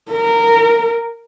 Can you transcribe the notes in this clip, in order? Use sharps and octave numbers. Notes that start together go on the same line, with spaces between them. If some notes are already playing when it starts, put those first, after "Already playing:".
A#4